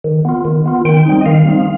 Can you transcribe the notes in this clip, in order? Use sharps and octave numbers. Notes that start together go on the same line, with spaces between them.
D#3
B3 F4
D#3
B3 F4
D#3 G5
G3 C4 D#4
D#5
D#3 F5
G3 C4 D#4